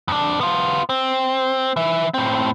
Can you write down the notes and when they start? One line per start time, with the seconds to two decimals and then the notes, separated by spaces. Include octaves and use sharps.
0.08 F2 D4
0.41 B3 F4
0.89 C4
1.76 E3 E5
2.14 A2 C4